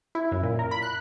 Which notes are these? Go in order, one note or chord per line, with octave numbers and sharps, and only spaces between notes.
E4
F#2
A#2
A#4
B5
F#6